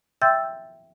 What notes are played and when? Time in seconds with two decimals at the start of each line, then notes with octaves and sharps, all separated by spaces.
0.22 E5 G5 C6 E6 G6 A6